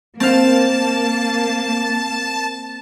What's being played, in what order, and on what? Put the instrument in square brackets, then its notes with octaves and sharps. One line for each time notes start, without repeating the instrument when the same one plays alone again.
[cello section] A#3 [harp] C4 F5 [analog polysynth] A5